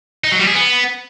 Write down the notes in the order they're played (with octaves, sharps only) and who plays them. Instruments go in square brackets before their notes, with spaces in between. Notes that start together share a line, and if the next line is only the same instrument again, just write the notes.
[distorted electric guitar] D#4
F#3
G3
G#4
B3